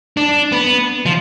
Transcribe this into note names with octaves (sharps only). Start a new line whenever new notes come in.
D4
B3
F3